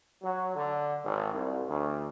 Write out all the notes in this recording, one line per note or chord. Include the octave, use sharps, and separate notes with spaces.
F#3
D3
G#1
C2
D2